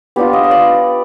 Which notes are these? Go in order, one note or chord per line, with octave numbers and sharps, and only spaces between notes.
B3 D4 F4 G4
D#5
D#5
D5